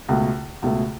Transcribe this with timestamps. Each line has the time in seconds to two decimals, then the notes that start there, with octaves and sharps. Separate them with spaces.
0.09 C#2 B2 A3
0.62 C#2 B2 A3